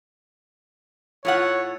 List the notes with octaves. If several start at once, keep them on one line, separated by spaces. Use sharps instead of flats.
A2 F4 C#5 F#5